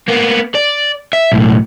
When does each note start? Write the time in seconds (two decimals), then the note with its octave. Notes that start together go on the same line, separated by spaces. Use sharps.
0.08 A#3 B3
0.55 D5
1.13 E5
1.32 B1 A2